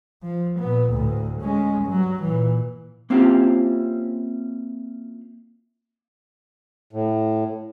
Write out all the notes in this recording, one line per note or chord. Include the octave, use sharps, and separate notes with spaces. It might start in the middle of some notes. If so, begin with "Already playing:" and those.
F3
A#2 B3
D2 A2
G#3 C#4
G2 F#3
A#2 E3
A#3 C4 C#4 E4 F4 G4
A2